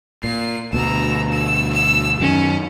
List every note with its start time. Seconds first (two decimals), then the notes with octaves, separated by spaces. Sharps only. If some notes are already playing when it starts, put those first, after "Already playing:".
0.24 A#2 C7
0.73 D2 B2 A#5 E6
1.32 E6
1.73 E6
2.20 F#2 D#3 C#4